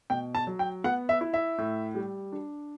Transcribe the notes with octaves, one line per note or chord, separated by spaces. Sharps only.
B2 G5
A5
F#3
G5
B3 F#5
E5
E4
E5
A2
G3
D4